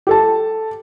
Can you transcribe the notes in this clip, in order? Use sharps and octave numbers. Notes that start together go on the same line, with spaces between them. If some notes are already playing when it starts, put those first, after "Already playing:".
G4 A4 A5